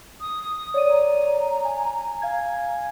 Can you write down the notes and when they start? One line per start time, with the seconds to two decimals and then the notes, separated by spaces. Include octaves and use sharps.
0.21 D#6
0.74 C#5 D5 D#7
0.90 A#5
1.65 G#5
2.22 F5 G#5 G#6